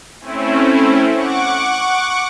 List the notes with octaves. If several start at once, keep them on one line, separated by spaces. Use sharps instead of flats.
A3 C4 C#4 E4
F#5 C#6 D6